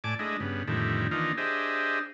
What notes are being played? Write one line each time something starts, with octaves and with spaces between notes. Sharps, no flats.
A2 D5 G#5 A5 D6
G#3 A3 D4 E4 D#5
G2 C#3 B3
F2 A2 D3 D#3 G3 E4
D#3 E3 A#3 D4 D#4 F4
D4 G4 G#4 C5 D#5 E5